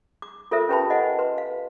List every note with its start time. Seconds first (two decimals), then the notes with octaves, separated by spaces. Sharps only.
0.22 D6
0.51 F4 A4 A#4 C5 E5
0.69 C#4 G4 B4 G5 A5 B5
0.90 C5 D#5 F#5 G#5
1.19 B4 C6
1.38 F5